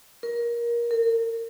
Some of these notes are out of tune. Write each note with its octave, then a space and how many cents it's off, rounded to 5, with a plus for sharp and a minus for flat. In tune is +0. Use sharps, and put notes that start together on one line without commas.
A#4 +20
A#4 -30